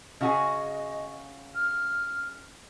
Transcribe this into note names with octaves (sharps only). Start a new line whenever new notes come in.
C#3 F#4 G#4 D#5
F6